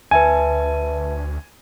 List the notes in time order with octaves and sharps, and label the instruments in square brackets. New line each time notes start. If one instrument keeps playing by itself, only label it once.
[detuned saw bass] D2 [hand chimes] B4 E5 A5 [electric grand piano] G#5